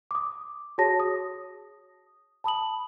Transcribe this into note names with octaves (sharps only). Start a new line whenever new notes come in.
D6 D#6
F#4 G#4 C#5 A5 A#6
D#6
A5 B5 D#6 F#7